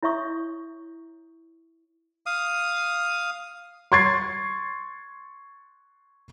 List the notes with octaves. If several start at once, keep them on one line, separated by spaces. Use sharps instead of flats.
E4 C#5 E5 C#6 D#6
F5 D#6
C6 C#6 G#6 A6 C7